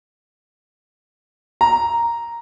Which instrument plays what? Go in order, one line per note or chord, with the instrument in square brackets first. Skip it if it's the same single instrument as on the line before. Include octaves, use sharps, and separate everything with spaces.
[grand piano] A#5